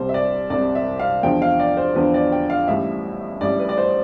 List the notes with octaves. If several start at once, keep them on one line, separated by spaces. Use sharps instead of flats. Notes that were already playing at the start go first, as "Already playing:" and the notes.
Already playing: C2 C3 G3 C5
E5
D5
C2 C3 G3 D5
E5
F5
E2 D3 F3 G5
F5
D5
C5
E2 D3 F3 B4
D5
G5
F5
A1 A2 G3 E5
A1 A2 G3 D5
B4
D5
C5